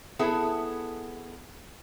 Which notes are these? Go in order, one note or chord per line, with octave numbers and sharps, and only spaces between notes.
B3 E4 G#4 A4